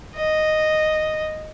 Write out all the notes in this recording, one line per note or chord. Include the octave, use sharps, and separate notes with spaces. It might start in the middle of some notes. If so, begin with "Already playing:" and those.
D#5